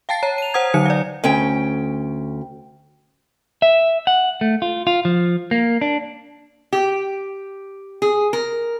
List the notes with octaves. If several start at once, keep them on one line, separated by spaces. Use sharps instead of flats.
F5 G5 A5 A6 C7
C#5 A#5
D#7 F7
C5 F#5 A#5 D#6 G#6
D3 F#3 D#4 C#7
D5 F5
D2 C#4 G5
E5
F#5
A3
F4
F4
F3
A#3
D4
G4
G#4
A#4